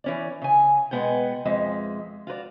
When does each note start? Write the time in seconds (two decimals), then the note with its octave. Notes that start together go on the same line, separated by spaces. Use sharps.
0.04 E3 C#4 D5
0.42 C#3 G#5
0.91 B2 E3 G#3 B3 F#5 G5
1.45 F2 G#3 E5
2.27 F4 F#4 B4 D5